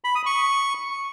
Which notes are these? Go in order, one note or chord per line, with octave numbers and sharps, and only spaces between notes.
B5
D#6
C#6